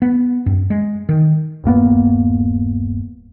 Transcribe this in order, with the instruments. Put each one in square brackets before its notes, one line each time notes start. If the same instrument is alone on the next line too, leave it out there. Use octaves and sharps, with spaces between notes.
[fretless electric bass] B3
F#2
G#3
D#3
[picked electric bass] D#1 G2 A#3 B3